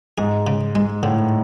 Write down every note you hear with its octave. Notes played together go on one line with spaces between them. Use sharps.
G#2 G#4
C#3
G#3
A2 D3